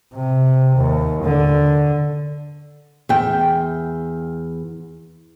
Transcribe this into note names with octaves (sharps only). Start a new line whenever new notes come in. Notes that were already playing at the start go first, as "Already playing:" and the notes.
C3
D#2
D3
E2 G5